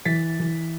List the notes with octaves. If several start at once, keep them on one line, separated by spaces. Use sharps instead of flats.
E3 A6 B6
E3